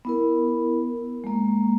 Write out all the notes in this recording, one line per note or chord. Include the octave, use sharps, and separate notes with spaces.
B3 E4 A#4
G#3 A#3